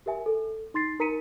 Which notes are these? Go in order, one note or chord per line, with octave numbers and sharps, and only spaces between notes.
G4 A#4 E5 G#5
A4
D#4 C6 A6 C7
D#4 A#4 A#5 B6 C#7 D#7